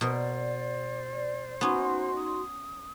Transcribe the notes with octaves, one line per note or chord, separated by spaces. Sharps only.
B2 A#4 C5 D5
B3 C#4 D#4 F#4 C6
D#6